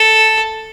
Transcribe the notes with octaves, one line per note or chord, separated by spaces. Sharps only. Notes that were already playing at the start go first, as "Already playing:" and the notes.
Already playing: A4